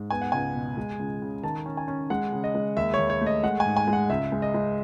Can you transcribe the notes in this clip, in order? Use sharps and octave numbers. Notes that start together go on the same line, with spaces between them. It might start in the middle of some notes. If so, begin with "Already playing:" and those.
Already playing: G#2
B3 G#5
F#5
C#2 G#5
B2
G#3
C#2
C#3
D#3 A5
C#4
G#5
C#4
G#3 F#5
C#3
D#5
G#3
D#2 E5
C#5
D#2
C#5
A3
D#5
G#3 F#5
G#5
G#2
G#5
G#3
F#5
C#2 E5
G#3
D#5
G#3